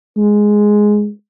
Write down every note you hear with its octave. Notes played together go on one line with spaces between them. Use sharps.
G#3